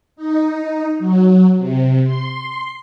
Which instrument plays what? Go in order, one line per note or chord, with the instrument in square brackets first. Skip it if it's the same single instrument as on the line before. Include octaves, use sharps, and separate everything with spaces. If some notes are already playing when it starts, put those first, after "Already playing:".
[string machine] D#4
F#3
C3
C6